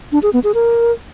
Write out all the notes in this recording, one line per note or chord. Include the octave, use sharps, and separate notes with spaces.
D4
G#4
B3
G#4
A#4